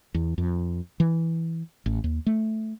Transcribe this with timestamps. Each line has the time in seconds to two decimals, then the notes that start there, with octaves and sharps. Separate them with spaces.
0.14 E2
0.38 F2
1.00 E3
1.86 A1
2.04 D#2
2.26 A3